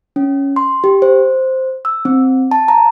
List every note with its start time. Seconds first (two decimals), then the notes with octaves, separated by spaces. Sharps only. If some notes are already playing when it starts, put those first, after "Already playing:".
0.16 C#4
0.56 C6
0.84 G4
1.02 C5
1.85 E6
2.05 C4
2.51 A5
2.68 A#5